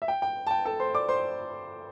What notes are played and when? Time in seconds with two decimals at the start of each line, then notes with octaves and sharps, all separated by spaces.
0.02 E5
0.08 G5
0.22 G5
0.47 A5
0.51 G5
0.65 A4 A5
0.80 C5 C6
0.94 D5 D6
1.09 C5 C6